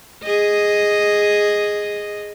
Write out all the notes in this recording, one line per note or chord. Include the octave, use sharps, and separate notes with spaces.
G#4 D#5